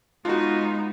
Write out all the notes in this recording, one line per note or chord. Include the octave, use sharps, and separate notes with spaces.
G#3 B3 D#4 F4 F#4